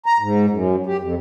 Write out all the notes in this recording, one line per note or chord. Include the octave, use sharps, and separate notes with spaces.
A#5
G#2
F#2
G4
F2